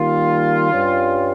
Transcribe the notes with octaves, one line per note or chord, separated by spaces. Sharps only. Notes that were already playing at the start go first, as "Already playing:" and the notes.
Already playing: D#3 G3 A#3 F4
G2 G3 C#4